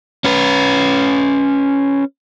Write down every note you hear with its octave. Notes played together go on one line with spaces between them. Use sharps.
C#4 B4